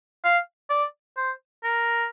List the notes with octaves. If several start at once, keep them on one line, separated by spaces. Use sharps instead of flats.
F5
D5
C5
A#4